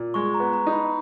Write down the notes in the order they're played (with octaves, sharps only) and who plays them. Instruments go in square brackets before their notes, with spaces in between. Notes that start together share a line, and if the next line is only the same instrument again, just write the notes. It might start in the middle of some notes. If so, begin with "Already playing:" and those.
Already playing: [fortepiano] A#2
[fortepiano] G#3 [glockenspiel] C#6
[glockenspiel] A#5
[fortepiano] B3
[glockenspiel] A#5
[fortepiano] D#4
[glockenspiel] B5